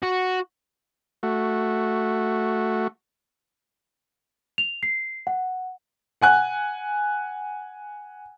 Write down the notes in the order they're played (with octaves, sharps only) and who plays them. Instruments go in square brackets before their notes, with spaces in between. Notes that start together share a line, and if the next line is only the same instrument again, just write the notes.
[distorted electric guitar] F#4
[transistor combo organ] A3 F#4
[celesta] F7
C7
F#5
[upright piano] F#5 G#5 F#6